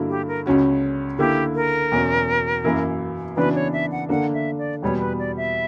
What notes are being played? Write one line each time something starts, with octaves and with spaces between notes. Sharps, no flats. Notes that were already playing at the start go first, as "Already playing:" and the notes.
Already playing: G2 D3 F#3 A#3 E4
G4
A#4
C#2 C#3 F#3 C#4 F#4
D3 A#3 E4 G4
A#4
E2 B2 F#3 C#4 F#4
F#2 E3 A#3 E4
C#3 E3 B3 D4 F#4 B4
C#5
E5
F#5
D3 A#3 D4 F#5
E5
D5
E2 B2 G3 B3 C#5
B4
D5
E5